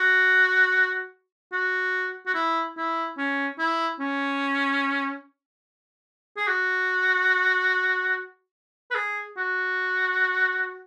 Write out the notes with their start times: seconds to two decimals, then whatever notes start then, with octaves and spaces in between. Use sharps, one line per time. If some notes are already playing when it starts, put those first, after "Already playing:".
Already playing: F#4
1.53 F#4
2.27 F#4
2.35 E4
2.77 E4
3.18 C#4
3.59 E4
4.00 C#4
6.37 G#4
6.48 F#4
8.91 B4
8.95 G#4
9.37 F#4